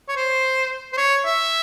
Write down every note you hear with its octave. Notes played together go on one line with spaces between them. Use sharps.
C#5
C5
C5
C#5
E5